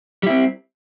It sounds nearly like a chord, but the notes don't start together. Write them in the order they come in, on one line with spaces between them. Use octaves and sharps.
G3 E4 C4